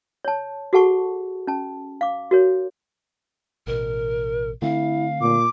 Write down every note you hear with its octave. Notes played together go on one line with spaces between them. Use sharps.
C#5 A5
F#4 G#4 A4 F#5 A5 C#6
C#4 A5
F5 D6
F#4 A#4 C#5
A1 B2 A#4
D3 A3 C4 E4 F5
A#2 D6